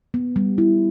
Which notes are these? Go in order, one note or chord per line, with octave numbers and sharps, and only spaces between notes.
B3
G3
E4